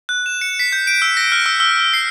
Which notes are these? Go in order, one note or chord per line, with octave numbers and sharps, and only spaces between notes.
F#6
E7
C#7
B6
G6
D7
E6
A#6
F6
E6
E6
C7